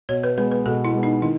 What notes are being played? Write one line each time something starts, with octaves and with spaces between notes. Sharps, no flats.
B2 C#5
B4
G#3 B3 B4
B4
B2 A4
E4
G#3 B3
D#4
D#3 E4